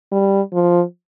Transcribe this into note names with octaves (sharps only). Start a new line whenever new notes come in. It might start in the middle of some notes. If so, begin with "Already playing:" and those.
G3
F3